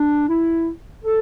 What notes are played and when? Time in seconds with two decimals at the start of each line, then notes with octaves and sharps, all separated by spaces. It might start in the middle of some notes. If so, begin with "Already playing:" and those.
Already playing: D4
0.28 E4
1.04 A4